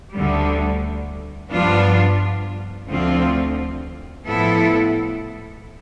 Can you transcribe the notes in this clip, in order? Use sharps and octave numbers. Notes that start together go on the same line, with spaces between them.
D2 D3 G3
G2 F3 B3 D4 F4
D2 D3 F3 C4 F4
A2 F3 B3 E4 A4